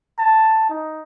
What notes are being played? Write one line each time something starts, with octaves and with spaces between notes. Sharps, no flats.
A5
D#4